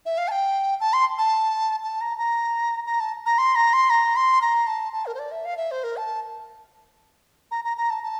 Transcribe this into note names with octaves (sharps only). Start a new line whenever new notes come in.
E5
F5
A5
G5
A5
C6
A5
A5
A#5
A#5
A#5
A5
A#5
C6
A#5
C6
A#5
C6
A#5
A5
A5
A#4
C5
D5
E5
F5
E5
C5
A#4
A5
A#5
A#5
A#5
A5
A5